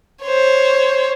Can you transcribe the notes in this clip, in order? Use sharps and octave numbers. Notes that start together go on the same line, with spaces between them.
C5 C#5